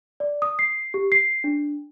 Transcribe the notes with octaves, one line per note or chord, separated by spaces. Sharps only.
D5
D#6
C7
G4
C7
D4